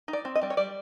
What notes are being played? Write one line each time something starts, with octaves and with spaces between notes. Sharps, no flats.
D#4
D5
C4
D#5
G3 D5
C#5
G3 D5